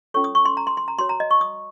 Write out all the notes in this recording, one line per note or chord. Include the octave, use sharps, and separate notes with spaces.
C#4 F4 A4 C#5 C#6
D#6
C#6
C6
A#5
C6
C6
A#5
F#4 A#4 C#5 C6
A#5
D#5
C#6
D#6